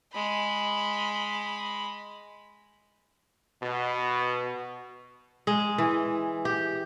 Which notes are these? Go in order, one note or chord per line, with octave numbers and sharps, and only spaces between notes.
G#3 B5
B2
G#3
E3
G4